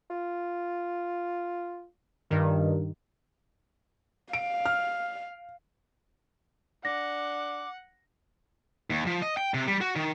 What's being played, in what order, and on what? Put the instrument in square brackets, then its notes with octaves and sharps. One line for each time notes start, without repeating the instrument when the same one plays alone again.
[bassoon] F4
[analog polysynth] G2 D#3 [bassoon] A#2
[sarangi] F5 [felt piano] D7
[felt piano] F6
[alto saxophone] D4 [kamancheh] F#5 [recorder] D6 [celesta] A#6
[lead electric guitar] D#2
F3
D#5
G5
C3
G3
F#4
D#3